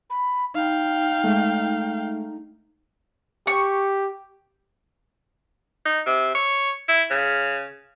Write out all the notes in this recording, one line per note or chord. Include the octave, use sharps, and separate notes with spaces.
B5
D#4 F5 G5
G#3 A3
G4 C#6
D#4
C3
C#5
E4
C#3